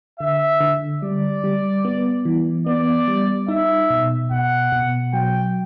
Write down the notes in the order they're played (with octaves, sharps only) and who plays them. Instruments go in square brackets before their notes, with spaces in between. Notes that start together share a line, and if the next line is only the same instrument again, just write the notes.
[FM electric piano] D3 [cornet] E5
[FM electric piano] D3
[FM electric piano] G3 [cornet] D5
[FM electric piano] G3
B3
E3
[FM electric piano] B3 [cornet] D5
[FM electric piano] G3
[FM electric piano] D#4 [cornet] E5
[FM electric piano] B2
[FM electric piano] B2 [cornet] F#5
[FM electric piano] B2
[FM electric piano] F#3 [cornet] G5